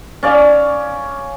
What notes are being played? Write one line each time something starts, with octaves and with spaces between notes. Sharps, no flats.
C#4 D5 F5